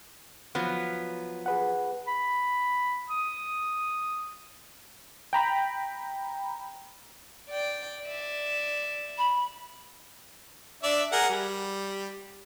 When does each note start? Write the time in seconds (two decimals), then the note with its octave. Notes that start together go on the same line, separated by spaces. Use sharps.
0.55 F3 F#3 B3
1.46 G#4 B4 F#5
2.08 B5
3.10 D#6
5.33 G5 A#5 B5
7.50 D5 G5
8.02 D5 E5
9.18 B5
10.83 D4 D5 E5
11.12 G#4 A#4 F#5
11.29 G3